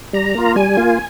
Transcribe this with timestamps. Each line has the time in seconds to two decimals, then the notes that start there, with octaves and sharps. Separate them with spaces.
0.13 G3 A#5
0.35 A#3 F4
0.56 G3 G#5
0.77 A#3 F4